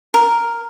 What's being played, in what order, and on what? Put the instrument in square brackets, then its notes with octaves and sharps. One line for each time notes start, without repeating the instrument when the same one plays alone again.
[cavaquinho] A#4